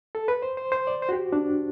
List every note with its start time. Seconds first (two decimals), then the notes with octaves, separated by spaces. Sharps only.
0.15 A4
0.28 B4
0.42 C5
0.57 C5
0.72 C5
0.87 D5
1.02 C5
1.09 F#4
1.12 G4
1.33 D4